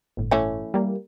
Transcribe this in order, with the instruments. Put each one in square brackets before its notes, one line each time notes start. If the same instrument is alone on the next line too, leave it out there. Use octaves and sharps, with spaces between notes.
[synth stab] G1 A2
[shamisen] E3 A3 C#4
[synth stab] G3 A#3